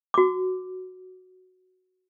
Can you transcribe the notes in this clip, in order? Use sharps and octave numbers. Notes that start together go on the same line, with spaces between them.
F#4 D6